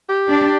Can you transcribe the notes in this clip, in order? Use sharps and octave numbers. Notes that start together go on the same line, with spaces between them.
G4
D4